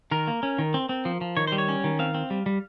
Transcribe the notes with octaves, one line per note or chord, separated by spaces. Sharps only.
D#3 A#4
A#3
C#4
D#3
C4
C4
F3
F3
D#3 C#5
G3 C5
C#5
C#4
D#3
C4 F5
C4
G3
G3